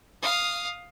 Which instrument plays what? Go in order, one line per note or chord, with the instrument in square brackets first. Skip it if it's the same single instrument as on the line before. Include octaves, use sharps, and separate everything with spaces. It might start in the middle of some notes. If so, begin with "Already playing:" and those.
[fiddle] F5 D#6